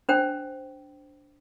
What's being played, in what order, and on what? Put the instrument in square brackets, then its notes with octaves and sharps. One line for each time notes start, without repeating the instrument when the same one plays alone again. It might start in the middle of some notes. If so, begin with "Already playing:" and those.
[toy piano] D4 C5 G5